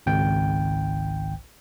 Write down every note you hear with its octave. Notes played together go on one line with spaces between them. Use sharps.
G#1 C#2 G5